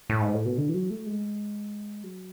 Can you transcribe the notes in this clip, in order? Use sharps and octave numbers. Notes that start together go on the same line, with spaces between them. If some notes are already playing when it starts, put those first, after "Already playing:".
A2
G#2
A2
B2
D3
E3
F#3
A3
G#3
F#3